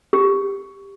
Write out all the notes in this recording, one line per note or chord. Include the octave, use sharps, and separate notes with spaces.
G4